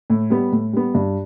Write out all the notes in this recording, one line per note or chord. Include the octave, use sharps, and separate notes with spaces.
A2
G3 B3
A2
G3 B3
G2